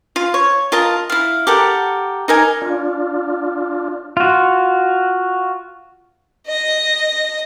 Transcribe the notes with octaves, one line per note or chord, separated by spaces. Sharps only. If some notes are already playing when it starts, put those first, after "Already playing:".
F4
C#5
F4 A#4 D#5 A5
E4 F5
G4 A4 A#4 F#5
D#4 A#4 G#5
D4 F4
F4 F#4
D#5 A#6